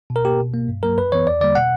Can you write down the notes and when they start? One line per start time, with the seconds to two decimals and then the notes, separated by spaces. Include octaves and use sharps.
0.10 B2
0.16 A#4
0.25 A#3 G4
0.40 B2
0.54 A#3
0.68 G2
0.83 F#3 A#3 A#4
0.97 F#2 B4
1.12 E3 B3 C#5
1.26 E2 D5
1.41 D3 G3 A#3 D5
1.55 B2 F#5